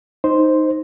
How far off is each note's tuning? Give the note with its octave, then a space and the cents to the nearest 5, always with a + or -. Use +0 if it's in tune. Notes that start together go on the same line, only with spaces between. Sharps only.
D#4 +0 C5 +0